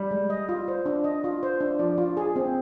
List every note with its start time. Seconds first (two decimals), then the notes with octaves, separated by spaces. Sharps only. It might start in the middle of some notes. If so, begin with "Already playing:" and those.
Already playing: G3
0.11 G#3
0.30 D#5
0.49 F4
0.68 C5
0.86 D4
1.04 D#5
1.24 F4
1.43 C5
1.60 D4
1.79 F3 D5
1.98 F4
2.17 G#4
2.36 C4